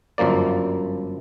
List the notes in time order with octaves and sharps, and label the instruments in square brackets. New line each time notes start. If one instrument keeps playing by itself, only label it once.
[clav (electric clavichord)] G1 F#2 F3 A#3 D5